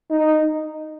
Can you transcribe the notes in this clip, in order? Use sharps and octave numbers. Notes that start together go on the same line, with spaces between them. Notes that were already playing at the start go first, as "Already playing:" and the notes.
D#4